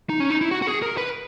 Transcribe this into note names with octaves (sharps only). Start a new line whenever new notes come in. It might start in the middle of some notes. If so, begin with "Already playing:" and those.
D#4
C#4
D#4
E4
F#4
F#4
G#4
A#4
B4